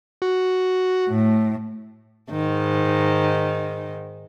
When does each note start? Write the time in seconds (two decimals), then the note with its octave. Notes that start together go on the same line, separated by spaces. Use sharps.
0.22 F#4
1.09 A2
2.31 G#2 D#3